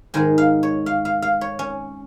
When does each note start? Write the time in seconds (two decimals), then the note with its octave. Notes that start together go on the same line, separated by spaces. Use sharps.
0.14 G#2 D#3 G#3 G#5
0.38 F5
0.63 C#5
0.86 F5
1.05 F5
1.22 F5
1.41 C#5
1.59 C#4